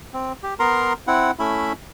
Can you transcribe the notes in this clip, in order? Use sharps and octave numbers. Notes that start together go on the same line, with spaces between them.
C4
G4
B3 A#4 A#5 C6
C4 E4 F#5
A3 C#4 E4 E5 B5